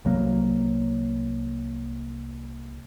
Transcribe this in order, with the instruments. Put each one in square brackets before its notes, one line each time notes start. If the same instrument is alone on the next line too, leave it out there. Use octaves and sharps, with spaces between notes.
[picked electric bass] C2 F#3 A#3